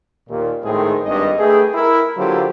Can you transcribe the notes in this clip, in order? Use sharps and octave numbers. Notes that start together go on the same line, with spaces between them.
D#2 A#2
G#1 A2 D#3 G#3 C4 G#4
G#1 G2 D#5
A3 G#4 B4 E5 G5
E4 A#4
D3 F#3 A#3 F4 G4 C5